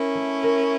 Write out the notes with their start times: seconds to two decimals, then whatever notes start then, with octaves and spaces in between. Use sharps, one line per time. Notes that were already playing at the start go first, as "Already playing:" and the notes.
Already playing: C#4 E4 A#4
0.15 A3
0.43 A#4